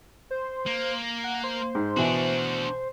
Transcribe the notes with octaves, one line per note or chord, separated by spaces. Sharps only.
C5
A#3
F#5
C5
G#2
B2 E3 D4 F#4